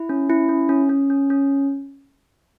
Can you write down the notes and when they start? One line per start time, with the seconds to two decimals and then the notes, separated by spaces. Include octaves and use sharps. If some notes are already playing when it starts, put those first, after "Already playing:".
Already playing: E4
0.09 C#4
0.30 E4
0.49 C#4
0.69 C#4
0.89 C#4
1.10 C#4
1.30 C#4